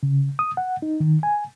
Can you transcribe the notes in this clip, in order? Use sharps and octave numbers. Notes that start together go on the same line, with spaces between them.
C#3
D#6
F#5
D#4
D#3
G#5